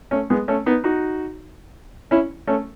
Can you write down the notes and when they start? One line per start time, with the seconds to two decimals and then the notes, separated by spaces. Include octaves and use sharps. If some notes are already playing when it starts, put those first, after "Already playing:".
0.11 A3 C#4
0.30 G#3 B3
0.48 A3 C#4
0.66 B3 D#4
0.84 D#4 F#4
2.11 C#4 E4
2.47 A3 C#4